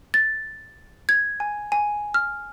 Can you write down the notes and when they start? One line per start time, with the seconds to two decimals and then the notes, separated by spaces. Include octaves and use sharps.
0.14 A6
1.09 G#6
1.40 G#5
1.72 G#5
2.14 F6